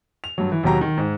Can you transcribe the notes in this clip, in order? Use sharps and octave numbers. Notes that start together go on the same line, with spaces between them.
F7
G2 F#3
E3
D#2 B2 F#3 G4 A#5
D#3
G#2